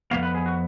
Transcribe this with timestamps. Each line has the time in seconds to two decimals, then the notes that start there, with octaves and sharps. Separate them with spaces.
0.11 F2 F3 B3 F5
0.23 B4
0.35 G#4
0.46 F#4